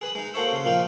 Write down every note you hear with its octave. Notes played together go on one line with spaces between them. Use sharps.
G#4 B4 G#5 D#6
G#3 D#4
A#3 F#4 A4 C5 C#5 E5
C#3 C6
A#2 F3 D#4 F4 G4